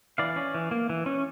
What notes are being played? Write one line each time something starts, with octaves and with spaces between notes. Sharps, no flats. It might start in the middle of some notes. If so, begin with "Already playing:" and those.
E3 D5 F5
C#4
E3
A#3
E3
C#4